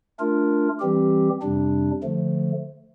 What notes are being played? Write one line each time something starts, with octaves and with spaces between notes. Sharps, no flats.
A3 D4 F4 A#4
E3 G3 C4 G4
F2 C3 G3 D4
D3 F3 A3